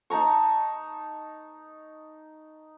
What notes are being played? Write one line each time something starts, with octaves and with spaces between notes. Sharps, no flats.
D#4 A5 A#5 C#6